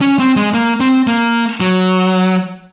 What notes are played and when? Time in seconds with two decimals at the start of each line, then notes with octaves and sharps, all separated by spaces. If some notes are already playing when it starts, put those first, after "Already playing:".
0.01 C#4
0.19 C4
0.36 G#3
0.54 A#3
0.80 C4
1.07 A#3
1.60 F#3